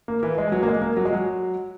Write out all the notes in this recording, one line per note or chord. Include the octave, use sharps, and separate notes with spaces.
A#3
E3
G#3
F#3
A#3
G#3
A#3
F#3
G#3
F#3